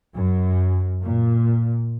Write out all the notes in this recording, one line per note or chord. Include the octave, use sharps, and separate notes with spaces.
F#2
A#2